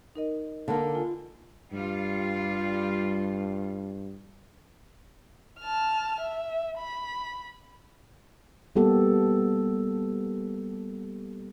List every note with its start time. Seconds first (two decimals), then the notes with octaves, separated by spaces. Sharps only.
0.15 D#4 A#4 D#5
0.68 D3 A#3 B5
0.95 F4 G#5
1.73 G2 G3 F4
5.60 A5 F6
6.20 E5
6.78 B5
8.76 G3 A#3 B3 G4 A4